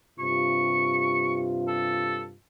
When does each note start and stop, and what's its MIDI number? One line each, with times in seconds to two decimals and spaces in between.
0.19 2.35 43
0.19 2.35 48
0.19 2.35 65
0.19 1.40 85
1.67 2.21 69